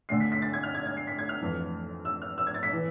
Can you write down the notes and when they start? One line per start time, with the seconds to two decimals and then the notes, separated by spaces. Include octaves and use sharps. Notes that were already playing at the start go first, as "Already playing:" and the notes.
0.09 D2 D3 C7
0.20 B6
0.32 B6
0.42 A6
0.53 G#6
0.63 F6
0.75 G#6
0.86 G#6
0.97 C7
1.07 B6
1.19 G#6
1.29 F6
1.41 F2 E3
2.05 E6
2.22 F6
2.38 E6
2.47 G#6
2.54 A6
2.63 B6
2.73 E3